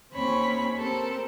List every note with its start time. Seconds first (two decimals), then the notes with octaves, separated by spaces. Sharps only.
0.14 D#2 C4 C#4 C#5 B5
0.77 C4 G4 A4 A#4